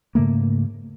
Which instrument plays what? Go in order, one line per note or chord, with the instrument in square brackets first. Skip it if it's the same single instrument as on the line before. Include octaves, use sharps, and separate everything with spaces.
[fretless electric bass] G#2 C#3 A3 A#3